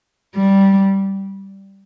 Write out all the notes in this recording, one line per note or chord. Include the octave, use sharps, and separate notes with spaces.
G3